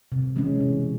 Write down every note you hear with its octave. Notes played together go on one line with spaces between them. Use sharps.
C3
E3 G#3 C#4
B2